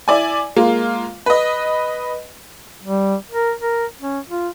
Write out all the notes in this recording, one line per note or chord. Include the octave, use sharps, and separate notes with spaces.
E4 D5 G#5
G#3 A#3 F4
B4 D#5
G3
A#4
A#4
C#4
F4